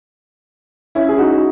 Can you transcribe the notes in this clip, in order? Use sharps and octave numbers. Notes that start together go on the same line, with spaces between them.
C#4 E4
G#4
D#4 F#4